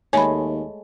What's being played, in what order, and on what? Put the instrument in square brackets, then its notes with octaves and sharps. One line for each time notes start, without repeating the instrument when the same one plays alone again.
[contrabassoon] D#2 [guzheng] G#3 A3 [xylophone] C#5 B5 [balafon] G#5